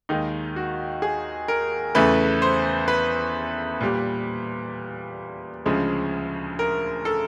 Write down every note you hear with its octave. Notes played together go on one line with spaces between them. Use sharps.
D#2 D#3 G#3 D#4
F#4
G#4
A#4
E2 C#3 E3 A3 B4
C5
B4
A#2 G3
D2 C#3 F3 G#3
A#4
A4